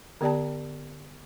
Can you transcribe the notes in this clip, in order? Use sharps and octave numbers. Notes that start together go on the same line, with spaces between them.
D3 B3 G4 D5 G5 A5